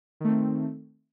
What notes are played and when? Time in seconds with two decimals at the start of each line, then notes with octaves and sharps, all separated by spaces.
0.20 D#3
0.24 A3
0.28 C4